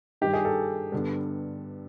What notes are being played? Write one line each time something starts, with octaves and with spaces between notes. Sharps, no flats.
G2 D#3 G3 G4
G#4
A4
G2 D3 G3 B3